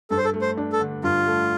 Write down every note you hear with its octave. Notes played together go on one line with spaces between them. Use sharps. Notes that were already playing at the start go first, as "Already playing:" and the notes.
G2 A4
C5
A4
A3
C5
D4
A4
D3
G2 F4
A3